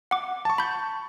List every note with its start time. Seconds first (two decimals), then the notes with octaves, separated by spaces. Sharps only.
0.11 F#5 D6
0.45 A5 C#6
0.58 B5 G6